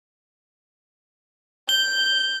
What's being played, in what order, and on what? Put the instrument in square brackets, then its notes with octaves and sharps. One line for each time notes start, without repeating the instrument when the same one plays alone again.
[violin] G6 [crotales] G7